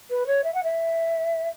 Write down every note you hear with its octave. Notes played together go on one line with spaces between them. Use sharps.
B4
C#5
E5
F#5
E5